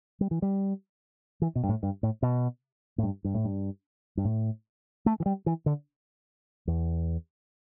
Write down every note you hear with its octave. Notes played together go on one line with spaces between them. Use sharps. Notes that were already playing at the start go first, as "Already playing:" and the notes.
G3
E3
G3
E3
B2
G2
A2
G2
A2
B2
A2
G2
G2
A2
G2
G2
A2
A3
E3
G3
E3
D3
E2